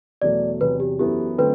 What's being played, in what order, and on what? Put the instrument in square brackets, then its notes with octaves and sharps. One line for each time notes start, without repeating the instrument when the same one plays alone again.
[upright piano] E2 B2 F#3 A3 [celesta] D5
[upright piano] E2 C3 F#3 [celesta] B4
[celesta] G4
[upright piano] F#2 E3 B3 E4 A4 [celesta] G4
[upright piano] D3 F#3 A3 C4 [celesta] B4